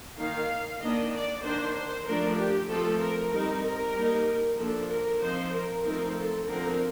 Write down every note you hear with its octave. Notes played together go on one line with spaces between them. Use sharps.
D#3 A#3 D#4 F5
D#3 A#3 D4 D#5
D5
D#3 A#3 D4 C5
C5
F3 A3 D4 A#4
G4
F3 A3 C4 A4
A#4
G3 C4 D#4 A#4
A#4
G3 A#3 D#4
F3 A#3 D4 A4
A#4
F3 C4 D#4 C5
A#4
F3 A3 C4 D#4 A#4
A4
D3 F3 C4 A#4